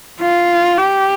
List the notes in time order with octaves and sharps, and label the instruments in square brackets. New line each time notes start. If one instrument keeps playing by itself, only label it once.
[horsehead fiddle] F4
G4